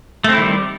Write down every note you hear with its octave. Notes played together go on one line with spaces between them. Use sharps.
D#3 G3 A3 C4 E4